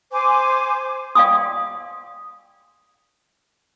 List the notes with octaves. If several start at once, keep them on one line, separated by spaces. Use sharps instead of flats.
C5 G#5 D6
D5 F5 G5 G#5 C6 D#6